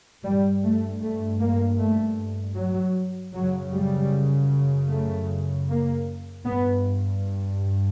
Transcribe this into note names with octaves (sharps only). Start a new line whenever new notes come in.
G2 G3
A3
A3
A#3
A3
F#3
F#2 C#3 F#3
G3
A3
A#3
G2 B3